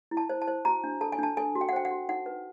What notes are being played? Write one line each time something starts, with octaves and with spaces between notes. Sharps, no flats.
E4
A5
C5
A5
C5
F#4 A#5
D4
A4 A5
G#5
D4 A5
A4 G#5
F#4
G5
F#5
C5 G5
F#5
F#4
D#4 F#5
B4